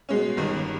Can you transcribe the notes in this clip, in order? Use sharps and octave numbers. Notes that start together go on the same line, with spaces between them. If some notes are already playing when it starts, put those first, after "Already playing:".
B2 G#3 C#4
G1 G2 D#3